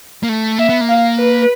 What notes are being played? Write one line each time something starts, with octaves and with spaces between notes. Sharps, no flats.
A#3
A3
A#3 E5
B3
A#3
F5
B4